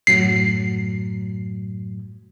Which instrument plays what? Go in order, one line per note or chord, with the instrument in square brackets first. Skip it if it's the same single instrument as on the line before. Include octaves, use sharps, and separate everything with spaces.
[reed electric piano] F#2 A2 F#3 [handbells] C7